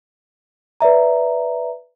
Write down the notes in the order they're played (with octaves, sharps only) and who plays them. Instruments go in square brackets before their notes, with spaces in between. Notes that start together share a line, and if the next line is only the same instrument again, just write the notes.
[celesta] B4 D5 E5 A#5